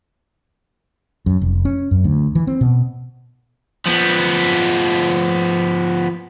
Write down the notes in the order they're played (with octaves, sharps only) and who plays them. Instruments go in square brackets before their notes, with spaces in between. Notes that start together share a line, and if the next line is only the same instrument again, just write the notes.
[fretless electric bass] F#2
F1
C#4
F#2
D2
E3
C4
B2
[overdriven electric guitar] F3 B3